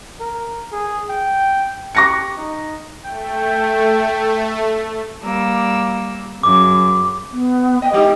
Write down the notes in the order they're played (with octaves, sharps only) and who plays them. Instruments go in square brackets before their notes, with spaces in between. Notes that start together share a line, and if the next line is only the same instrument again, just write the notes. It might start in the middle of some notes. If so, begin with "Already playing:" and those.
[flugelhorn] A#4
G#4
G5
[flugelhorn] G4 [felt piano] C#6 A#6 C#7
[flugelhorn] D#4
[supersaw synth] A3 [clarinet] G5
[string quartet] G3 A#3 E6
[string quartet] F#2 C#3 [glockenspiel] D6
[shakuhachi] B3
[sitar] D#5 [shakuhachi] G5
[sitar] G#3 D#4 [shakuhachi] G4